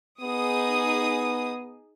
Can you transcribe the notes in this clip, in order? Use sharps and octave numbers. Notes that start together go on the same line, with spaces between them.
B3 D#4 G#4 D#6